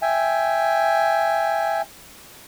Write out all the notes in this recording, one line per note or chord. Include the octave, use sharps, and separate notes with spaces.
E5 G5 G#5